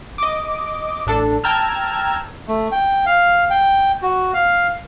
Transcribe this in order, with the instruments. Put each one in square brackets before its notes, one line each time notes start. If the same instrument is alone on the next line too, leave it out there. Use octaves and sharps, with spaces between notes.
[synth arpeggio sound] D#5 D6
A1 D4 A4
G5 A5 A#5 E6 F6 G#6
[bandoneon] A3
G5
F5
G5
F#4
F5